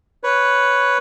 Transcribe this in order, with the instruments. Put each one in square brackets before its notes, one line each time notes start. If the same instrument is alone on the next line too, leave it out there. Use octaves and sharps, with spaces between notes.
[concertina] B4 C#5